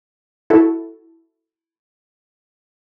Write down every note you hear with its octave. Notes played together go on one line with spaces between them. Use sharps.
E4 F#4 A4